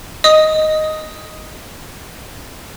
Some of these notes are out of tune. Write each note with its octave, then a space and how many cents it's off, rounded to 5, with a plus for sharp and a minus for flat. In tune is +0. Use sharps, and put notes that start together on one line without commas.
D#5 +0 D#6 +10